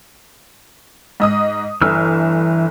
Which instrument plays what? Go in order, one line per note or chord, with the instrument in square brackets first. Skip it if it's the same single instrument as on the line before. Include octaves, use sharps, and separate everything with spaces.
[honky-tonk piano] G#2 D#5 D#6
[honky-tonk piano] G1 [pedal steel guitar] E3 E6 F6